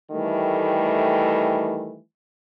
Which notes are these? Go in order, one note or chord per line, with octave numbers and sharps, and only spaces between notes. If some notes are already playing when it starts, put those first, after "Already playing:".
D#3 E3 G3 A3